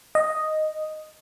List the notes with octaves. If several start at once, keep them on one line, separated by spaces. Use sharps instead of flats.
D#5